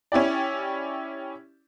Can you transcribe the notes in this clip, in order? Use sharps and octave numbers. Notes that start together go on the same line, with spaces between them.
C#4 E4 G4 D5